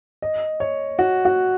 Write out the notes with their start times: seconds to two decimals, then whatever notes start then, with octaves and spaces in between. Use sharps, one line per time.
0.22 D#5
0.60 C#5
0.99 F#4
1.25 F#4